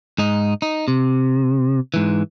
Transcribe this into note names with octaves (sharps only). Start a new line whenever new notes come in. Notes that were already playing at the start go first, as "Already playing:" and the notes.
G#2 D#4
D#4
C3
G#2 E3